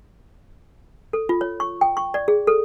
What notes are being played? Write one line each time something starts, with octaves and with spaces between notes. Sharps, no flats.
A4
F4
C#5
C#6
G5
C#6
D5
G#4
A4